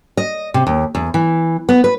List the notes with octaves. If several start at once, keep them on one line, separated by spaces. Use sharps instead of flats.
D#5
C3
D#2
E2
E3
B3
B4